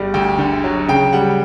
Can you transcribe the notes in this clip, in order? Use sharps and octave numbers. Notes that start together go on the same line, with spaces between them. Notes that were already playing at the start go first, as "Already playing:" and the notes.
Already playing: G1 G3
D2 G5
D3
F#3
C#3 G5
G3 F#5